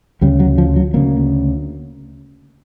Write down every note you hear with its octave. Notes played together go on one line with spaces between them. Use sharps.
D2 C#3 G3
F#3
F3
F#3
D2 C#3 A#3